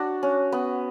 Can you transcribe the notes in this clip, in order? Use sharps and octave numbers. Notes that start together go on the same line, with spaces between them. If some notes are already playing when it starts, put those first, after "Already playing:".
Already playing: D4 F#4
C#4
B3